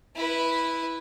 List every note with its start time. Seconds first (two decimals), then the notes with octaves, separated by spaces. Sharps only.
0.16 E4 B4